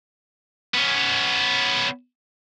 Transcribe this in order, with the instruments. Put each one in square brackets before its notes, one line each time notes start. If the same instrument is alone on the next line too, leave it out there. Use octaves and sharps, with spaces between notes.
[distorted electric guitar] B3 C#4